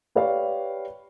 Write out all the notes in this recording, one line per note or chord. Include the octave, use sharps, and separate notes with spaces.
G4 B4 C#5 D5 F5